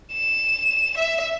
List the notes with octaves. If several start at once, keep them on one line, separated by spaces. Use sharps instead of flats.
E7
E5